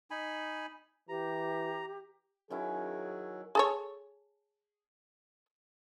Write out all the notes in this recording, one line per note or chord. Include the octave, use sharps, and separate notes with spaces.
D#4 G#5 B5
E3 G4 A#5
D#3 F#3 C#4 E4 G#4
G#4 A4 C#5